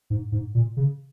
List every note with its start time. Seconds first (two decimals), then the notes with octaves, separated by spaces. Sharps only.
0.10 G#2
0.32 G#2
0.55 A#2
0.77 C#3